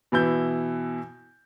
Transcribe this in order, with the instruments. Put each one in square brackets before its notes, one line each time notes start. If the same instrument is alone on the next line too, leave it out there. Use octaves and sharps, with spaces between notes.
[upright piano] B2 E3 E4 G6